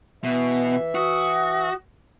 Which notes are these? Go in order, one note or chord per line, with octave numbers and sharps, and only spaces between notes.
B2 E3 E5
F#4 D#6